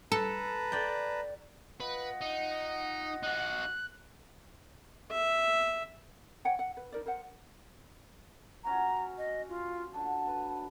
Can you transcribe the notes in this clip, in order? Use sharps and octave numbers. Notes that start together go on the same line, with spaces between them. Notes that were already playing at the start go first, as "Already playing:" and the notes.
A4 B4 A5 A#5
D5 G5
F4 B4 D#5 F#5
D#4
D#4 F#4 F#6
E5
C#5 F#5 G5
F#5
B4
D#4 A#4 D5
A#4 C5 F#5
C#4 F#4 A#5
D#5
F4
D3 F#3 A5
B4